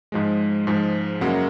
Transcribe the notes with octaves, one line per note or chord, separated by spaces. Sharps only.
G#2 F3 G#3
G#2 F3 G#3
F#2 C#3 F#3 A#3 F#5